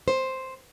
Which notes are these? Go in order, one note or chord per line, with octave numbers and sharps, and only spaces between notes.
C5